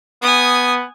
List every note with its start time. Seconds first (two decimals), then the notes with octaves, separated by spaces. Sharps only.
0.23 B3 G#5 D#6